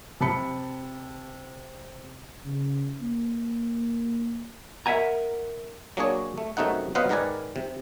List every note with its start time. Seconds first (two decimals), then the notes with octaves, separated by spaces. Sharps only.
0.20 C3 A5 B5 C#7
2.45 C#3
3.01 A#3
4.86 A#4 E5 F#5 G#5 A#5
5.97 F#3 A#3 D4 G#4 C#5
6.38 A3
6.57 F#2 C3 A3 D#4 F#5
6.95 F#3 B3 B4 C5 D#5 F5
7.09 G#2 D#3 A#4 B4 D5 G#5
7.56 C3